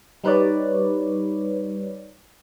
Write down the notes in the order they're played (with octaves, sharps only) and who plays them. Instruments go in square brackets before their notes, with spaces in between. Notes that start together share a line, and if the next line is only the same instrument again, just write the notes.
[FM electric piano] G3 D#4 B4 C#5 D5